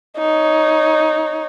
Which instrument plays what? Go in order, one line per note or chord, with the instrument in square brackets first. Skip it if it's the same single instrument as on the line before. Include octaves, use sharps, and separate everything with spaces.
[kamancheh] D#4 C#5